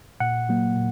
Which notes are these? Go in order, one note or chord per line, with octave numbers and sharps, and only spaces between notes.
A#2 F#5
F#3 A#3
A#2